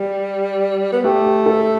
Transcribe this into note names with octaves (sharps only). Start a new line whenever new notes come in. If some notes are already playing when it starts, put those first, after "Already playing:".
Already playing: G3
B3
A3 G4
G4
A4